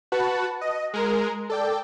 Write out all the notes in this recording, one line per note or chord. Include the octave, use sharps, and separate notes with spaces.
F#4 B4 F#5 A5
D#5
G#3 A#4
A4 D5 G5